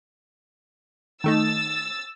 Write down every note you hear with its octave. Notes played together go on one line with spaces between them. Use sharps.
D#3 A3 D#4 E6 A6